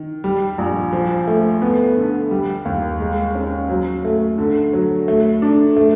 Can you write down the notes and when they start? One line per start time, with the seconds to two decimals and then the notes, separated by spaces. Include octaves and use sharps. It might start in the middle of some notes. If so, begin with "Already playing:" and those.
Already playing: D#3
0.24 G3
0.58 A#1
0.93 F3
1.27 A3
1.62 B3
1.97 D3
2.31 G3
2.65 D#2
3.00 G#3
3.35 C#4
3.69 F#3
4.05 A3
4.38 D3
4.73 F#3
5.08 A3
5.42 D4
5.76 A3